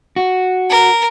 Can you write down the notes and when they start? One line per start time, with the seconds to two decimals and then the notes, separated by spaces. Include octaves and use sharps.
0.16 F#4
0.70 A#4